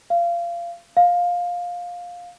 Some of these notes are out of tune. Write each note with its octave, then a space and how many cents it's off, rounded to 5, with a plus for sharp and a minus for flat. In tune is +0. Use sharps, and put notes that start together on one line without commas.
F5 -25
F5 +15